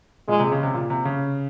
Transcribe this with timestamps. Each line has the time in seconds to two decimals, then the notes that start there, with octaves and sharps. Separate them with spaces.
0.28 A#2 G#3
0.39 C3
0.52 C#3
0.63 C3
0.74 A#2
0.90 C3
1.05 C#3